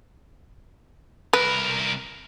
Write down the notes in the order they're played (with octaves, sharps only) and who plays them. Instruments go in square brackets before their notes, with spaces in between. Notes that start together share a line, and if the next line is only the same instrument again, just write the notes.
[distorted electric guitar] C2 A#4 [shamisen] B4